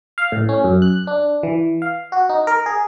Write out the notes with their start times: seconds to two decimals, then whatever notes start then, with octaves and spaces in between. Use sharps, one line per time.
0.18 F5
0.32 A2
0.49 C#4
0.64 F#2
0.82 F#6
1.07 D4
1.43 E3
1.82 F5
2.12 F#4
2.29 D#4
2.47 A#4
2.66 G#4